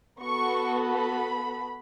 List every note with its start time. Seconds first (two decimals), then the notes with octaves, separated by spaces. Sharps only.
0.22 B3 F#4 A4 C#6
0.91 B5